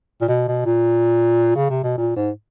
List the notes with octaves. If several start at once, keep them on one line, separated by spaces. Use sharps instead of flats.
A#2
B2
B2
A#2
C#3
C3
B2
A#2
G#2